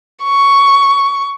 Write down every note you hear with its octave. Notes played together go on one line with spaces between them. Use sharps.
C#6